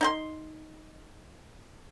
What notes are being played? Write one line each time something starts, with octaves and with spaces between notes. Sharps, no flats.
D#4 G5 C6